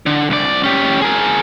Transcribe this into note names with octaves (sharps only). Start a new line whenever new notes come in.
D3
C2 D5
C#4 G4
G#4 A#4